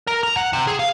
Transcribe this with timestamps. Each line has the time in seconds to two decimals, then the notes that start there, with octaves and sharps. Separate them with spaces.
0.07 A#4
0.23 A#5
0.37 F#5
0.53 C3
0.67 G#4
0.79 F5